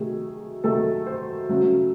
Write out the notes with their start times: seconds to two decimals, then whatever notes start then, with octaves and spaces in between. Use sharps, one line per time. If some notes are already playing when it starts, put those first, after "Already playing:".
Already playing: C3 D#3 F#3 A3 G#4
0.64 C3 D#3 F#3 A3 A4
1.06 C5
1.49 C#3 F#3 A3